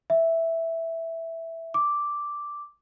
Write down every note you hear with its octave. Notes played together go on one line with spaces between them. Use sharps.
E5
D6